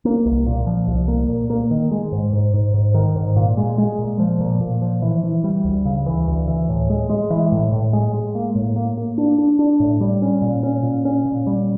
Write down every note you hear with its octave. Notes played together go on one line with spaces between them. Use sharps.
A#3
C2
A#2
F3
C2
A#3
A#2
A#3
D#3
G#3
G#2
G#2
G#2
G#2
D#3
G#2
A#2
G#3
G#3
A#2
F3
A#2
A#2
F3
E3
E3
G3
D2
C#3
E3
D2
E3
A2
G#3
G#3
E3
A2
A2
G#3
G#3
A#3
A2
A#3
A#3
D4
D4
D4
A2
G3
C#4
A#2
C#4
A#2
C#4
A#2
G3